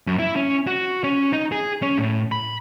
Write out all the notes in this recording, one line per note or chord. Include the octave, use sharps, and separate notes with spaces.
F#2
E4
C#4
F#4
C#4
D#4
G#4
C#4
A2
B5